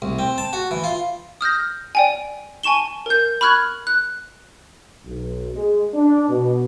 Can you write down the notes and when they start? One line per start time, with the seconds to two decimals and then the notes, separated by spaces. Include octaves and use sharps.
0.02 C2
0.19 C4
0.38 A5
0.53 F#4
0.71 E3
0.84 F4
1.41 D#6 F6 G6 A#6
1.95 D5 G5 G#5
2.63 G#5 A5 C#6 E7 G7
3.06 A#4 G6
3.41 B5 C#6 F6 F#6 G#6
3.87 F#6
5.05 B1
5.54 G#3
5.94 D4
6.28 B2